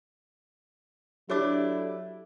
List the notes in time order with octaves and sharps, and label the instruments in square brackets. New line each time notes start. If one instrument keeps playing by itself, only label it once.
[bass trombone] F#3 [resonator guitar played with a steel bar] A3 D4 [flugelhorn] E4 [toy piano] G4 C#5 D6